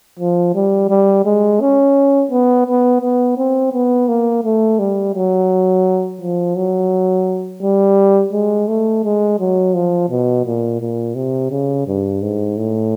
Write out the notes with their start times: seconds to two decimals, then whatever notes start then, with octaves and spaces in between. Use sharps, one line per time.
0.19 F3
0.55 G3
0.89 G3
1.25 G#3
1.61 C#4
2.31 B3
2.67 B3
3.02 B3
3.38 C4
3.73 B3
4.08 A#3
4.44 A3
4.79 G3
5.15 F#3
6.21 F3
6.56 F#3
7.62 G3
8.33 G#3
8.68 A3
9.04 G#3
9.39 F#3
9.74 F3
10.10 B2
10.45 A#2
10.81 A#2
11.15 C3
11.51 C#3
11.87 G2
12.22 G#2
12.57 A2